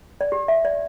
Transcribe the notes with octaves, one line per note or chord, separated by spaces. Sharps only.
D5
G4
E5
D5